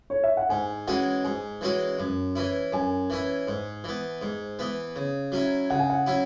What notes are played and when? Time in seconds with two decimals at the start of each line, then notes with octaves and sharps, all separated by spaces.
0.10 C#5
0.24 E5
0.37 F#5
0.49 G#2 G#5
0.87 E3 G#3 C#4 F#4 F#5
1.24 G#2 G#5
1.61 E3 G#3 C#4 F#4
1.99 F#2
2.35 E3 C#4 E4
2.72 F#2 G#5
3.10 E3 C#4 E4
3.48 G#2
3.84 E3 B3
4.22 G#2
4.59 E3 B3
4.96 C#3
5.32 F#3 C#4 E4
5.70 C#3 F#5
5.79 G#5
5.90 F#5
6.06 F#3 C#4 E4